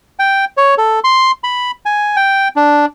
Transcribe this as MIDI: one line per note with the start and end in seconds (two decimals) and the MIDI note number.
0.19 0.45 79
0.57 0.75 73
0.78 1.00 69
1.04 1.31 84
1.44 1.71 83
1.86 2.16 80
2.16 2.48 79
2.56 2.86 62